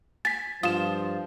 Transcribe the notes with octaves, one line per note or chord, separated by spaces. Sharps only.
G#5 A6 B6
G2 F3 F4 D#6 E7